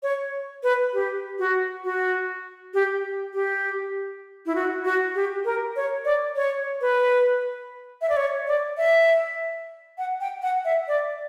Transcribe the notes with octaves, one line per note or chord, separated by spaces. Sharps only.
C#5
B4
G4
F#4
F#4
G4
G4
E4
F#4
F#4
G4
A#4
C#5
D5
C#5
B4
E5
D5
C#5
D5
E5
F#5
G5
F#5
E5
D5